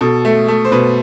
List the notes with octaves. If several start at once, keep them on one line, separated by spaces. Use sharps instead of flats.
B2 A4
A3
A3
C5
B2 B4